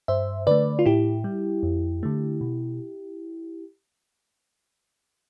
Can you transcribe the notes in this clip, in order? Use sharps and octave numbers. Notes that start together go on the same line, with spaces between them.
G2 C5 E5
D3 A3 B4 D5
F4
A2 E4 G4
G3
F2
D3 A3
B2